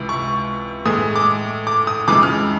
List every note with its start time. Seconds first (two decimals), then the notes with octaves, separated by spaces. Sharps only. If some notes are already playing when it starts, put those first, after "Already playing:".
Already playing: C#2 C3 E3
0.09 C#6
0.85 A2 E3 G#3 D#6
1.16 D6
1.67 D6
1.87 D#6
2.08 F2 C#3 E3 G#3 D6
2.23 F6